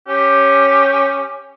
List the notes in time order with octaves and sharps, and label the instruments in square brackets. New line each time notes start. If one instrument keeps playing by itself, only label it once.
[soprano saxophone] C#4 [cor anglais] G4